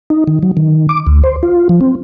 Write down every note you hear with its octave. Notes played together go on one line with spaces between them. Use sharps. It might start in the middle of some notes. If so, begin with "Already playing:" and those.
D#4
D#3
F#3
D#3
D6
D2
C5
F4
F3
C4